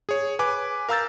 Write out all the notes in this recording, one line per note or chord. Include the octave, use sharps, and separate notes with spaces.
G#4 C#5
B4 G#5 D6
A#4 F5 A#5 E6 G6 A6